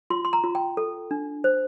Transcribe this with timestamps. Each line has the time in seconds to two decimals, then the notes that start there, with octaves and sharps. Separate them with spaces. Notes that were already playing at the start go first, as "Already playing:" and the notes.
0.10 F4 C6
0.25 C6
0.33 A#5
0.44 F4
0.55 G5
0.77 A4
1.11 D4
1.44 C5